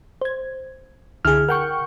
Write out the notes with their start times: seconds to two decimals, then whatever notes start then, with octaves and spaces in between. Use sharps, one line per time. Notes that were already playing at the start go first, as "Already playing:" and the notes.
0.21 C5 G#6
1.25 C#2 D3 E4 G#4 F6
1.49 A#4 F#5 G5 C#6